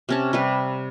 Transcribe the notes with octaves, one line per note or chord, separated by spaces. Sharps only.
C3 C#4 A5
C3 G3 B4